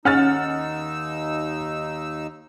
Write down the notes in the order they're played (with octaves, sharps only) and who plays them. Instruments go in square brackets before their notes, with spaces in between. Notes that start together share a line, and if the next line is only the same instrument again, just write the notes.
[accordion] D#2 D#4 E6 [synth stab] C#4 [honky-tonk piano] F#5 F6 A6